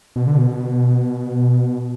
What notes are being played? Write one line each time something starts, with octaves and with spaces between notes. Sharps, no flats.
B2
D3
B2